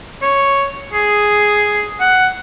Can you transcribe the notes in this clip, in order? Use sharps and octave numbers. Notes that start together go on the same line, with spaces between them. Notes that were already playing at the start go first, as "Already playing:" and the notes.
C#5
G#4
F#5